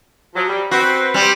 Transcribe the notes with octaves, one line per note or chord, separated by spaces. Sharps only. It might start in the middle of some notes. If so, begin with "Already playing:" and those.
F3 F#3
G3
C4 F#4 B4
G3 C4